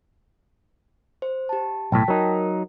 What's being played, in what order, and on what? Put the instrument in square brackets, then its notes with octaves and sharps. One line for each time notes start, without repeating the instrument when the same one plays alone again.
[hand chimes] C5
G4 A5
[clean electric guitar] B1 A2 [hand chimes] G5 A5 B6
[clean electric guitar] F#3 D#4 [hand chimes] A#4